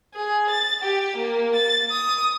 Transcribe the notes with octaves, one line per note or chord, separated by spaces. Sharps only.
G#4
A6
G4
A#3
A6
D#6